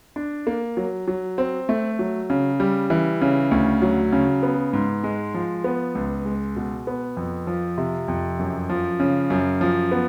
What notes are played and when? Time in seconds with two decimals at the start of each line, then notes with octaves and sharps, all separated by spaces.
0.16 D4
0.47 A#3
0.77 F#3
1.08 F#3
1.38 C4
1.69 A3
1.99 F#3
2.30 C#3
2.60 G3
2.90 E3
3.21 C#3
3.51 D2
3.82 F#3
4.12 C#3
4.43 B3
4.73 G#2
5.04 G#3
5.34 F3
5.64 B3
5.95 C#2
6.25 G#3
6.56 B2
6.87 B3
7.17 F2
7.47 F3
7.78 C3
8.08 F2
8.39 F#2
8.70 F3
9.00 C#3
9.30 F#2
9.61 F3
9.91 B3